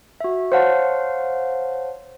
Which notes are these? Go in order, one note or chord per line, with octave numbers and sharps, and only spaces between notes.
F#4 E5
C5 C#5 F5 F#5 A5